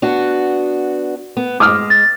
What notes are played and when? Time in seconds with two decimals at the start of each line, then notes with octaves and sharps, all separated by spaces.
0.02 B3 D4 F#4
1.37 B3
1.60 G#3 D6 D#6 F6
1.90 A6